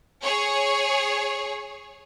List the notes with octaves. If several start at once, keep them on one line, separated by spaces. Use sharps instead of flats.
G#4 C#5